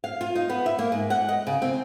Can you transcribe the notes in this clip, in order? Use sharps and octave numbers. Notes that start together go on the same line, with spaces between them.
F5
F4
D#4
B3
E5
A#3
G#2
F#5
D#5
C#3
C4